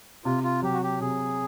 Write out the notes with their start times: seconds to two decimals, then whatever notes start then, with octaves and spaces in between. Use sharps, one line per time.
0.24 C3 F4
0.44 F4
0.62 F#3 G4
0.73 F#4
0.82 G4
1.01 C3 G#4